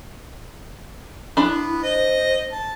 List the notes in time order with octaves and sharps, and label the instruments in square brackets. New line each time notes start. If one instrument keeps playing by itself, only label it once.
[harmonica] B3 [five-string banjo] D4 B5 [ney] E4
[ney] C5 [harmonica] D#5
[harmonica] A5